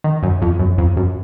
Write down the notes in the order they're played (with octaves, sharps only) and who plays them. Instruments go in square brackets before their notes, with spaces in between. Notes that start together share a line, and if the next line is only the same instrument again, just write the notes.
[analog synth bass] D#3
F#2
F2
F#2
F2
F#2